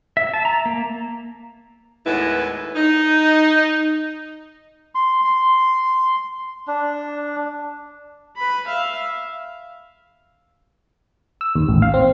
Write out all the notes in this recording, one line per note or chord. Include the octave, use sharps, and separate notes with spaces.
E5
A5
A#5
A#3
D#2 A2 G#3 B3 E4 B4
D#4
C6
C6
D4
B4 B5
E5 F5
E6
D#2
A1
F5
C4